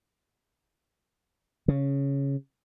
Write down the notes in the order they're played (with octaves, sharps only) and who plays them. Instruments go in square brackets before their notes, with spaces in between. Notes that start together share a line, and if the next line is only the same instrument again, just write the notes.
[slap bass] C#3